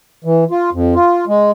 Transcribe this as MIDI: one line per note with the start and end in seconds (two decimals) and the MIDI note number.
0.25 0.44 52
0.51 0.70 65
0.73 0.94 41
0.95 1.25 65
1.27 1.51 56